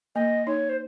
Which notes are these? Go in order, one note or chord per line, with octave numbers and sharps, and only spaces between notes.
A#3 D#5
D#4 C#5
C5